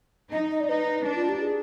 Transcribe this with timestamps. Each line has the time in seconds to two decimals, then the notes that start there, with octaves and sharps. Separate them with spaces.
0.32 D#4 D#5
0.51 D#5
0.60 D5
0.68 D#4 B4
1.05 D4
1.15 F4
1.29 G4
1.42 G#4